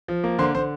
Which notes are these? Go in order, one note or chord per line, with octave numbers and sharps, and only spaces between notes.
F3
A#3
D3 C5 C6
D3 C5 C6